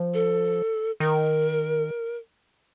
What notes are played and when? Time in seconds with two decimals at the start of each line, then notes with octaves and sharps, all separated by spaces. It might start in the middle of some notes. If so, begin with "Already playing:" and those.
Already playing: F3
0.14 A4
1.00 D#3 A#4